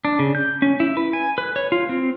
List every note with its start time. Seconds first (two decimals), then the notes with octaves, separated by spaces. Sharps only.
0.05 D4
0.19 C#3
0.35 G6
0.62 C#4
0.80 E4
0.97 B4
1.13 G#5
1.38 B4
1.56 C#5
1.72 F4
1.89 C4